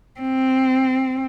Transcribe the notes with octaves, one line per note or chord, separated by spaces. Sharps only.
C4